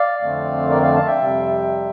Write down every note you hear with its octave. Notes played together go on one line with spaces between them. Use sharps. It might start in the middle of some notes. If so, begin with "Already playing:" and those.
Already playing: D5 F5
F2 D3 A3 C4
A#4 D5
D5 F5
F5 A5
E5 G5
F2 C3 G3